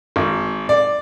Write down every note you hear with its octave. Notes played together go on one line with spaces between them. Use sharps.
G#1
D5